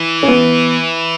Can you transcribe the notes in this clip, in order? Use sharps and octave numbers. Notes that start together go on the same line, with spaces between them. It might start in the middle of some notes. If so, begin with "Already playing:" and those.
Already playing: E3
C#4
B3